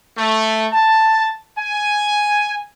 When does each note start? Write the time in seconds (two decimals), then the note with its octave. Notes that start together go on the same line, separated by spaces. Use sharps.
0.17 A3
0.73 A5
1.58 G#5